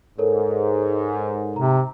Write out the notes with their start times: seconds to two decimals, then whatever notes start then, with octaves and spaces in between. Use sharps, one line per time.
0.18 G#2 A4 A#4 C#5
1.56 C3 A#5